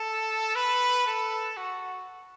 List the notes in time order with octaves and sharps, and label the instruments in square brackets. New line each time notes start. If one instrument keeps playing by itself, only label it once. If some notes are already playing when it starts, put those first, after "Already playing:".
Already playing: [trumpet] A4
B4
A4
F#4